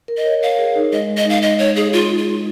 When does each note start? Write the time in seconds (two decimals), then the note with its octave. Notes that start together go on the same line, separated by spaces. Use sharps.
0.08 A#4
0.17 D#5
0.25 C#5
0.41 A#4 F5
0.59 G#4
0.76 D#4
0.92 G#3 D#5
1.09 G#3
1.17 D#5
1.25 D#4 F5
1.42 D#5
1.59 C#5
1.76 G#4
1.93 F4
2.18 F4